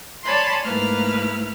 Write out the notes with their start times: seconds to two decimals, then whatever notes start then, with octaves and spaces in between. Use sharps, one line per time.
0.23 C#5 D5 G#5 A5 B5 C6
0.63 G#2 A3 A#3 E4 B4 F6